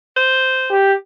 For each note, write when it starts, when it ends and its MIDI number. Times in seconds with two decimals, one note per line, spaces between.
0.16 0.72 72
0.70 0.95 67